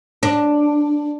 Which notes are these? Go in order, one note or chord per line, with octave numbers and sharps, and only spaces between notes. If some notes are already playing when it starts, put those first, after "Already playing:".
D4